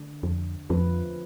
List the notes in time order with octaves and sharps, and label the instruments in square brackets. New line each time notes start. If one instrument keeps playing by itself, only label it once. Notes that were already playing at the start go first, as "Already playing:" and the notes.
Already playing: [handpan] D3 A3 D4
[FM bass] F2
[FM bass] F2 [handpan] F3 A3 C4 F4 B4